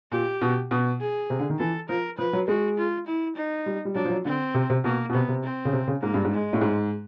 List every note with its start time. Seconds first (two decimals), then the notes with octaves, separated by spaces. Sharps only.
0.11 A#2 G4
0.42 B2
0.71 B2
1.01 G#4
1.30 C3
1.39 D3
1.50 D#3
1.59 E3 A4
1.89 F3 A#4
2.18 F3 B4
2.33 F#3
2.48 G#3 F#4
2.78 F4
3.07 E4
3.36 D#4
3.66 G3
3.85 G3
3.95 F#3 D4
4.05 F3
4.10 F#3
4.25 D3 C4
4.54 C3
4.70 C3
4.84 B2 A#3
5.09 B2
5.14 C3 B3
5.28 C3
5.44 C4
5.65 C#3
5.73 C3
5.88 C#3
6.02 G#2 A#3
6.14 G2
6.24 G#2
6.32 G#3
6.53 A2
6.61 G#2